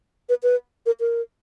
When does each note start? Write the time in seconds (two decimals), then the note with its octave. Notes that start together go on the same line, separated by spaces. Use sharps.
0.29 B4
0.43 B4
0.86 A#4
1.00 A#4